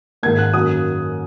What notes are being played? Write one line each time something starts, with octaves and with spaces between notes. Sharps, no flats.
G#2 D#3 A#3 G#6
F#6
F#2 D#3 A#3 D#6